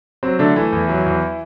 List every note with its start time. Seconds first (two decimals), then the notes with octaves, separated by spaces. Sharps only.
0.23 F#3 C4
0.39 D3 A3 D4
0.56 E3 A3 E4
0.72 E2
0.89 F#3
1.06 E2